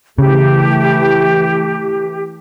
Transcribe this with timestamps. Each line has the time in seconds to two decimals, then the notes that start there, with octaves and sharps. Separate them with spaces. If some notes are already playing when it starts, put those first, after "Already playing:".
0.18 C#3 E3 A3 G4